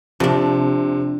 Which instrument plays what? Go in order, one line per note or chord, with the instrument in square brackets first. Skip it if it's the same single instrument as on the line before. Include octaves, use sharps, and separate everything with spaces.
[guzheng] F2 D4 [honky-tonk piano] C3